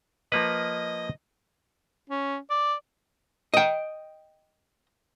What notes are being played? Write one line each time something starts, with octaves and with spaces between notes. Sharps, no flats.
F3 A#3 B4 D#5
C#4
D5
D#5 G5